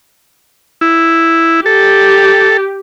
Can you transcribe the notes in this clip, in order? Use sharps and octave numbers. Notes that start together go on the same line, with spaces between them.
E4
G4 A4